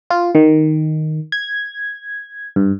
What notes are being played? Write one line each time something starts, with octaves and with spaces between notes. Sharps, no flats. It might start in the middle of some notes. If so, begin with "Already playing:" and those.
F4
D#3
G#6
G2